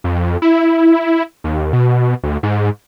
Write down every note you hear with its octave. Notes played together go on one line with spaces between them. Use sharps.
F2
E4
D#2
B2
D2
G#2